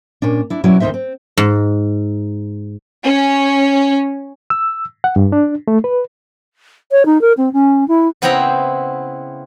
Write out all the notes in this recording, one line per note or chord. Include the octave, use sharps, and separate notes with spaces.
A#2 C#4 D4
D4 E4
B2 F#3 C#4 E4 D5
D2 D#3 C4 D#4 C5 E5
C4
G#2
C#4
E6
F#5
G2
D4
A3
B4
C#5
D#4
A#4
C4
C#4
E4
C#3 B3 C4 E4 G5 A#5